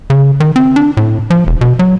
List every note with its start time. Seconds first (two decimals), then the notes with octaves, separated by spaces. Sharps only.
0.10 C#3
0.40 D#3
0.56 C4
0.76 D4
0.97 A2
1.30 F3
1.47 E1
1.61 B2
1.79 F#3